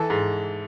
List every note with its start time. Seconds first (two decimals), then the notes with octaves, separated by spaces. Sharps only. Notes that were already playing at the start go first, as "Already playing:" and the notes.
Already playing: E3 A4
0.10 G#2